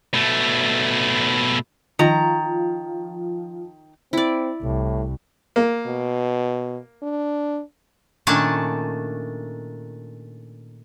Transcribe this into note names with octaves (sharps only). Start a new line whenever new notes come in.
B2 A3
D#3 F3 A#5
C4 E4 D5
C2 A2
A#3
B2
D4
A#2 D#3 A3 C#4 D4 A5